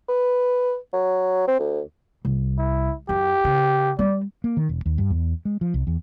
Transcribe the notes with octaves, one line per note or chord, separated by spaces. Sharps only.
B4
F#3
C4
D2
C2
E4
F#2 G4
C#3
G3 D5
A#3
D#3
E1
D#2
G2
E2
G#3
F3
C2
E2